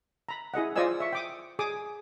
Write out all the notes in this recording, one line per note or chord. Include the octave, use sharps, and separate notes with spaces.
A#5 B5
E4 G#4 D#5 F#5
F4 C5 D5 D#5 G#5 E6
E5 C#6
G5 D6 D#6
G#4 D6 D#6